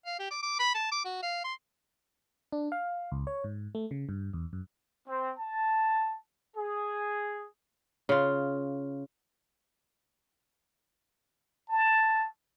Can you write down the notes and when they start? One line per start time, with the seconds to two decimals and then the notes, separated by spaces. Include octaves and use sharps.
0.06 F5
0.19 G4
0.31 D6
0.43 D6
0.59 B5
0.75 A5
0.92 D6
1.05 F#4
1.23 F5
1.44 C6
2.52 D4
2.72 F5
3.12 C#2
3.27 C#5
3.44 G#2
3.75 A3
3.91 C#3
4.09 G2
4.33 E2
4.53 F#2
5.08 C4
5.38 A5
6.56 G#4
8.09 C#3 F4
11.69 A5